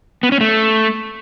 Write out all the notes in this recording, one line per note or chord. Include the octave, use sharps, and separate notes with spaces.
B3
C#4
A3